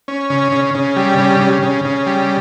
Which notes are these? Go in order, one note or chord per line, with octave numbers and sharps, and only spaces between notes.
C#4
C#3
C#3
C#3
G3
C#3
C#3
C#3
C#3
G3